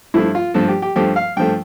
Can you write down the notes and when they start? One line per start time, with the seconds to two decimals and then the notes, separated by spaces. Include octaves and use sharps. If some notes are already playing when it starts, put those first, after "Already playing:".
0.14 G2 F3 A3 E4
0.35 F4
0.54 G2 F3 A3 A4
0.69 G4
0.82 G4
0.96 G2 F3 A3 G4
1.16 F5
1.37 G2 F3 A3 G5